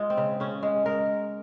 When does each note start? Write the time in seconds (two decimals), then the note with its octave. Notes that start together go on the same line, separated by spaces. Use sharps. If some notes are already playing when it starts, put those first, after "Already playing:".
Already playing: G#3 F4
0.10 C4
0.17 C#3
0.40 C#3 C#4
0.63 G#3
0.86 G#3 A#4